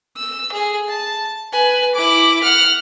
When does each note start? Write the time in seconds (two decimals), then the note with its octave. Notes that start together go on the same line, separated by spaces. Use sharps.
0.17 E6
0.52 G#4
0.89 A5
1.53 B4 G#5
1.95 E4 D6
2.43 F#5 F6